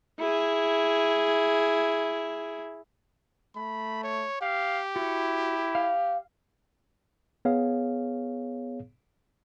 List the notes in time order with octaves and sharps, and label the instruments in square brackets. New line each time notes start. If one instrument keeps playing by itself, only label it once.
[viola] E4 G#4
[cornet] A3 [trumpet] B5
[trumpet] C#5
[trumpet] G4 [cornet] F5
[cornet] E4 [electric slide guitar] F#4
[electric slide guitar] F5
[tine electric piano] B3 G#4 C#5 F5